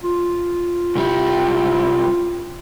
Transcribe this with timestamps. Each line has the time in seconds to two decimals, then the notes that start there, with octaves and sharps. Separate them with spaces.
0.04 F4
0.95 C2 G3